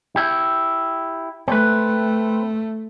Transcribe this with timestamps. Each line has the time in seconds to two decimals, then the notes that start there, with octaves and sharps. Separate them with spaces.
0.16 E4 G4
1.48 A3 C4 B4